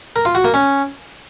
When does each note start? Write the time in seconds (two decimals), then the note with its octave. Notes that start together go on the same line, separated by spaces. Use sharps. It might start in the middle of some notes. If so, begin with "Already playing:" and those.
0.16 A#4
0.25 F4
0.35 F#4
0.44 A#3
0.54 C#4